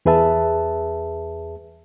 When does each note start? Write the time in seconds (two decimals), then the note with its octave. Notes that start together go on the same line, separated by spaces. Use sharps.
0.05 E2 G#4 B4 E5 A5